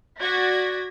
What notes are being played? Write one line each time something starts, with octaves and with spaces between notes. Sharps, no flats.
F#4 D5 G#6 A#6 B6